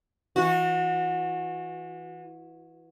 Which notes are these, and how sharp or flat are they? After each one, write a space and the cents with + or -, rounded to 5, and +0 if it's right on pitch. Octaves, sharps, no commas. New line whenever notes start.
E3 +0 F#4 -25